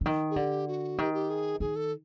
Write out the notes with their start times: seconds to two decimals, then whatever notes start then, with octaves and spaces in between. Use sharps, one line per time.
0.01 D3
0.06 D#3
0.31 G#4
0.36 D3 G4
0.68 F#4
0.98 D#3 G4
1.14 G4
1.30 G#4
1.60 D#3 G#4
1.76 A4